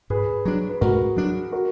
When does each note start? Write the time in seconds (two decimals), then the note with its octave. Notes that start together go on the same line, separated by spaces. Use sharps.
0.10 G#2 G#4 B4
0.45 F#3 D4
0.69 B4
0.81 G#2 F#4 A#4
1.17 F#3 D4
1.52 F#4 A#4